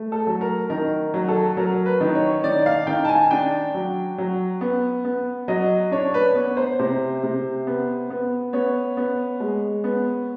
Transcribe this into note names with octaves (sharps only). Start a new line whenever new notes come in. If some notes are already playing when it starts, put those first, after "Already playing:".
Already playing: A3
A4
F#3
A#4
D#3 A#4
F#3
A4
F#3 A#4
B4
D#3
C#5
D#3 D5
F5
D#3 G5
A5
G#5
D4 G5
F#3
F#3
B3
B3
F#3 D#5
D4 C#5
B4
B3 C#5
C5
C3 C5
C3
B3
B3
B3 C#5
B3
G#3
B3